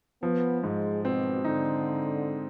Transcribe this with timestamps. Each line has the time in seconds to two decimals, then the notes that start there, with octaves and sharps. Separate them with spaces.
0.23 F3 B3
0.64 G#2 G#3
1.04 B2 C4
1.44 D3 D#4